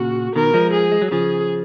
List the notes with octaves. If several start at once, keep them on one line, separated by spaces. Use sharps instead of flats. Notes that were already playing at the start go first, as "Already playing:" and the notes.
Already playing: A#2 C#3 F#4
B2 D#3 A#4
F3 G#3
G#4
G#3
F#3
C#3 F3 G#4